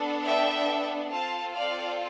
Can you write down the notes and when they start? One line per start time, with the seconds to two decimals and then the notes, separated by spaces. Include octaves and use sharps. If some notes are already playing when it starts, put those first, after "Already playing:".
Already playing: B3 D4 A4
0.26 E5 G5
1.12 C4 F4 A4 F5 A5
1.55 D5 F5